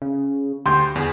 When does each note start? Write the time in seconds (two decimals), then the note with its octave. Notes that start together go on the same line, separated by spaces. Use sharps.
0.02 C#3
0.66 D2 D3 G4 C6 G6
0.96 E2 D3 G#4